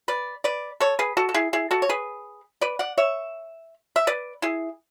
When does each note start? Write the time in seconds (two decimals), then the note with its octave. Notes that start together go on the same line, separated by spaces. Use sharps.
0.08 B4 D5
0.44 B4 D5
0.80 A4 C#5
0.99 G#4 B4
1.17 F#4 A4
1.29 A4
1.34 E4 G#4
1.53 E4 G#4
1.71 F#4 A4
1.82 C#5
1.89 G#4 B4
2.61 B4 D5
2.79 D5 F#5
2.98 C#5 E5
3.96 E5
4.07 B4 D5
4.42 E4 G#4